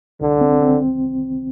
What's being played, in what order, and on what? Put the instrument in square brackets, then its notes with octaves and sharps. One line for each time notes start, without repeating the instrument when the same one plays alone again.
[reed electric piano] C2 [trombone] D3
[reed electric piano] C4
C4